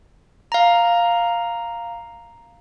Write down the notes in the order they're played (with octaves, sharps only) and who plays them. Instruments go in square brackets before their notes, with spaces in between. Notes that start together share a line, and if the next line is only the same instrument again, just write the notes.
[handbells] F5 A#5